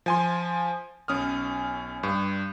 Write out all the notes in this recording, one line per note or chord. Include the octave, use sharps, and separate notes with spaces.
F3 G#5 C6
B1 C#4 D#6 F6
G2